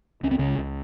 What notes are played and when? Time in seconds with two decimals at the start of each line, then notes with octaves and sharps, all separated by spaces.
0.23 C#2 C#4
0.31 C4
0.39 C#2 C#3 C#4
0.58 C#2